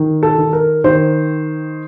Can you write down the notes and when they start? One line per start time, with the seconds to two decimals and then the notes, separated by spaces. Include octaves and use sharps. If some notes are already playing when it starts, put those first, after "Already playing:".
Already playing: D#3
0.23 A4
0.38 D#3
0.53 A#4
0.84 D#3 C5